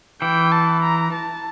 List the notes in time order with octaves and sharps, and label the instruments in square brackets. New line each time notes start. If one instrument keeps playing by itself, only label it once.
[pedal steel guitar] E3 [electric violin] G5
[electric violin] A5
A#5
A5